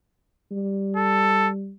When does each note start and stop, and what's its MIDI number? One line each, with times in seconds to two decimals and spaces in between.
0.52 1.73 55
0.96 1.49 69